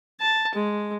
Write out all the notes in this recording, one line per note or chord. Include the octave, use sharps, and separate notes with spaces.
A5
G#3